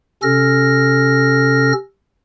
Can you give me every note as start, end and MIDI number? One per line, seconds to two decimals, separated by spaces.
0.23 1.73 48
0.23 1.73 61
0.23 1.73 69
0.23 1.73 89
0.23 1.73 94